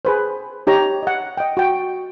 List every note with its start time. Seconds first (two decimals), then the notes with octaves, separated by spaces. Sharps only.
0.05 G#4 B4 C5
0.67 D#4 G4 C#5 A#5
1.03 D#5 F#5
1.37 D#5 G5
1.57 F#4 G5